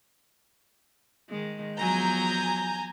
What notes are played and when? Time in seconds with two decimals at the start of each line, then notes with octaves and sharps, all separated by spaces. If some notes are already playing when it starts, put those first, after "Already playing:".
1.30 D#3 G#3
1.79 E2 F3 F#3 G#5 A#5 G6